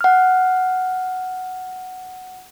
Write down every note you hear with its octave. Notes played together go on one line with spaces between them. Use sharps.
F#5 F6